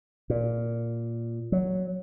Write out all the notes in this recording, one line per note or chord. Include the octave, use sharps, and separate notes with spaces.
A#2
F#3